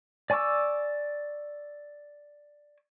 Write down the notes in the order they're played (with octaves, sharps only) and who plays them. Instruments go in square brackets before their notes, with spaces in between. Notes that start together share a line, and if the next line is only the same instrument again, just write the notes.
[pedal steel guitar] D5 G#5 C#6 D6 E6